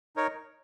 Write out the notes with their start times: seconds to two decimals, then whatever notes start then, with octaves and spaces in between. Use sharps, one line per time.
0.16 D#4 A#4 C#5